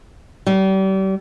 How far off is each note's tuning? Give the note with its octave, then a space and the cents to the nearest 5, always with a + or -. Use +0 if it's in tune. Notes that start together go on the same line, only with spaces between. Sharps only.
G3 -35